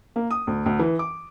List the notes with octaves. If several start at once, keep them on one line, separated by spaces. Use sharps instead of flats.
A#3
D#6
D2
D2
E3
D6